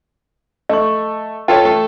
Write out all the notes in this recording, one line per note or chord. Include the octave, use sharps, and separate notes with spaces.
A3 D#5 C#6
F4 A4 C#5 G5
A3 A4